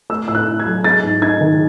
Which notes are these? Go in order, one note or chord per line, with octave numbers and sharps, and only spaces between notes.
A3 E6
A2 E6
F#6
E4
G#6
F#3
G#3 A6
G#2
D#4 G#6
D#3